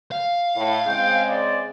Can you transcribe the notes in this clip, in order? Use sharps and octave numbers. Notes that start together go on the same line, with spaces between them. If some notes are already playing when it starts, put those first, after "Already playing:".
F5
A2
C#3 G#3 C4 G5
D5